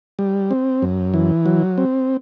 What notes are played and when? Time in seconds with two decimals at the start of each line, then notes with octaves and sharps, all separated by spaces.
0.19 G3
0.51 C4
0.82 F#2
1.14 E3
1.46 F#3
1.78 C4